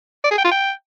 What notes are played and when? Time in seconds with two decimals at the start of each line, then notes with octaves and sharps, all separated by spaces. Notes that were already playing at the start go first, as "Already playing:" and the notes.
0.24 D5
0.31 G#4
0.38 G5
0.45 F4
0.51 G5